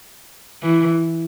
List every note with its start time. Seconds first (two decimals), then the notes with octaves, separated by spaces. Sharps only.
0.63 E3